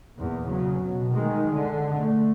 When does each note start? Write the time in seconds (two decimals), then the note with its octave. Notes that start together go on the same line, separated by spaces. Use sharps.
0.17 E2 A#2
0.47 C#3 F#3
0.83 B2
1.14 D#3 G#3
1.54 D3
1.97 A3